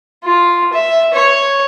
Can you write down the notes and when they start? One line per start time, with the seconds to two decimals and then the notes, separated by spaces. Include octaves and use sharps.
0.24 F4
0.73 E5
1.14 C#5